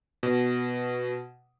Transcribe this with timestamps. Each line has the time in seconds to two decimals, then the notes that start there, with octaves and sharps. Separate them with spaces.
0.23 B2